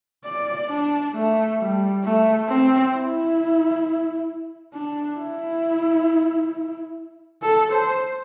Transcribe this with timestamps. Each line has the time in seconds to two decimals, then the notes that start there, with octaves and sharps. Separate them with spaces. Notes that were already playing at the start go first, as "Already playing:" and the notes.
0.24 D5
0.69 D4
1.14 A3
1.59 G3
2.04 A3
2.48 C4
2.93 E4
4.73 D4
5.18 E4
7.42 A4
7.73 C5